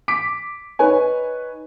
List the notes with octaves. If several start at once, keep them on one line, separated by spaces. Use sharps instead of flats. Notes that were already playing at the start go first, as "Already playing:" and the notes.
D6 B6 D7
D#4 B4 C#5 G#5